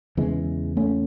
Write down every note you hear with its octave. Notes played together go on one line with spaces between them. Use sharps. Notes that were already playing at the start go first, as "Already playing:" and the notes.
E2 C#3 E3 G#3
A3 C#4